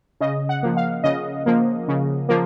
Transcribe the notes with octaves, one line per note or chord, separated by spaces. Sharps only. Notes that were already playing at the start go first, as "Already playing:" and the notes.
C#3 D#5
F#5
F3 A#3
F5
C#3 D#5
F3 A#3
C#3
F3 A#3